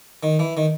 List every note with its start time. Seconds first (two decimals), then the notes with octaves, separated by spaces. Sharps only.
0.23 D#3
0.39 E3
0.57 D#3